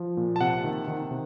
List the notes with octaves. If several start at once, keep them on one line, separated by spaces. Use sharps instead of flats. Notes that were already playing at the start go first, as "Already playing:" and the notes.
Already playing: F3
A#2
A5
C3 F#5
D#3
D#3
C3